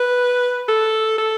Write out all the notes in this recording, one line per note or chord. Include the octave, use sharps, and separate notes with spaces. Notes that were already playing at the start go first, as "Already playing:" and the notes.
Already playing: B4
A4
A4